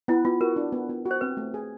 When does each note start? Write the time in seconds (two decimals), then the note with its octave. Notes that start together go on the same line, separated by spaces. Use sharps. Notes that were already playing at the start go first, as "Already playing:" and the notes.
0.08 B3 E4
0.25 B3 F4
0.41 F#4 A#4
0.56 D4
0.72 B3
0.89 B3
1.05 F#4
1.11 C5
1.21 C4 B4
1.37 A3
1.54 G#4